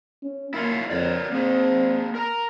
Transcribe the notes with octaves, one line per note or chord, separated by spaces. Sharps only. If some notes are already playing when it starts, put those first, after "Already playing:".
C#4
A#3 E4 F4 C#5
F2 A#4 C#5 D5
A#3 C4 G#4
A#4 A#5